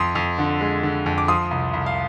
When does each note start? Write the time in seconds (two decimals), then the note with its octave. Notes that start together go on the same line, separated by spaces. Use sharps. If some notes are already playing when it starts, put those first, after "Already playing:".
Already playing: F2 C6 D#6
0.15 F2
0.38 D3
0.61 G#3
0.83 D3
1.06 F2
1.18 D6
1.28 F3 C6 D#6
1.51 C2
1.73 C2
1.86 F5